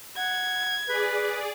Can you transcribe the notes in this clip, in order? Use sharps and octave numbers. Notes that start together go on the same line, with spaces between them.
F#5 G#6
G#4 B4 D5